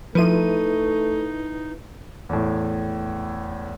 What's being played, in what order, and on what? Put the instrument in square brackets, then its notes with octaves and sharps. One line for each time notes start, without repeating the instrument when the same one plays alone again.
[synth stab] F3 D#7 [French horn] A3 [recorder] D#4 [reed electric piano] E4 B4
[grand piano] E2 A2